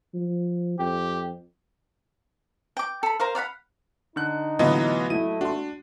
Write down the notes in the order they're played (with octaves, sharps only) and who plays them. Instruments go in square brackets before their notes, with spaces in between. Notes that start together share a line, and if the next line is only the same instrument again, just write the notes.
[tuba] F3
[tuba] F2 [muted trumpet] G4
[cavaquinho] G5 D6
A4 B5
A#4 C5 F5
D5 F5 F#5 B5
[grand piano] D3 F#6 [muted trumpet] D#4
[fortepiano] A2 D3 [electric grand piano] E3 B3 F4 [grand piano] F#3 D#5
[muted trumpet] A3 [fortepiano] E4 [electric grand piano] D#7
[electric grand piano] D4 [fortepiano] F#4 C6